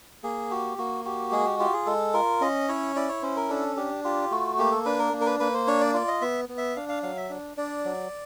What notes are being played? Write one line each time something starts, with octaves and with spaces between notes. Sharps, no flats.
A#3 G#4
F#4 G4
A#3 F#4
F#4 G4
G#3 G#4
G4
F4 G4
G#4
G#3 A4
F4 A#4
C#4 D#5
E4 C#5
E4 D5
C#5
C#4 C5
A#4
D4 A4
D4 G4
F4 G4
A3 F#4
A#3 G4
A4
D4 B4
A#4
A#3
A#4
B4
A#3 B4
C5
D4 C#5
D5
F4 D5
D#5
B3 E5
B3
E5
D4 F5
F5
F#3 F5
E5
D4
D4 D5
F#3